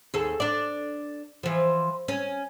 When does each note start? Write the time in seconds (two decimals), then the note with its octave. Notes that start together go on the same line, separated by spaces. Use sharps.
0.14 D#2 G#4 A4
0.40 D4 D5
1.43 E3 F3
2.08 C#4